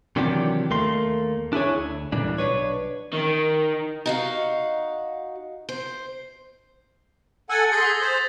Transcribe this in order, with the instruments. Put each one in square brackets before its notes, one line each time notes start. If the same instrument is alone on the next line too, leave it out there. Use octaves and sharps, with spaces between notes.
[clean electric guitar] C3 D#3 E3 F#3 D4 G4
D#2 A3 A#3 C6
D4 E4 G#4 C#5
D2
A#2 D3 E3 G3 D4
B1 D4 B4 C#5
[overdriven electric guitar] D#3
[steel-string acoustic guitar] D#4 F#4 F5
C5
[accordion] A4 F#5 G#5 [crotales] E6 G#6 A6
[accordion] G#4 C6 G6 [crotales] A6 A#6
[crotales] D#6 B6
[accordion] C5